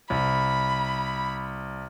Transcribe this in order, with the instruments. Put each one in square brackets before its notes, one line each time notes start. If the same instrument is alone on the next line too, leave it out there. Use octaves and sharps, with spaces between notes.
[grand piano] C2 [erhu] B5